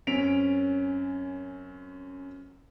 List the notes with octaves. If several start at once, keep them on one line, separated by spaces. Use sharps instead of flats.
F#2 C4 C#4 B6 D7 F7